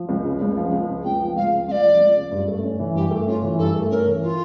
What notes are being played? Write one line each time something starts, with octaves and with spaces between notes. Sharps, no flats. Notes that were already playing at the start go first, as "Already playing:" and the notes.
Already playing: F3
C#2
C#3
C#2
F3
C#2
C#3
C#2 G5
F3
C#2 F5
C#3
C#2 D5 F5
F3
C#2
C#3
G2
A3
C#4
E3
G2 G4
A3
C#4 F4
E3
G2 A4
A3
C#4 A#4
E3
F4